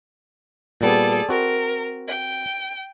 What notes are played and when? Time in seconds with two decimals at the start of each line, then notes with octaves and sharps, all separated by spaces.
0.81 A#2 G3 B3 G#4 A4 D5
1.29 C4 F#4 A#4
2.07 G5